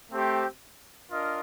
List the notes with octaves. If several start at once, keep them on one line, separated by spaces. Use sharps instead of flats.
A3 C4 G4 C5
D4 F4 A#4 D#5